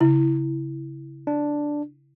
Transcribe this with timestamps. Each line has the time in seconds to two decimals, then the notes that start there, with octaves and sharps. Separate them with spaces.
0.01 C#3 E4
1.27 D4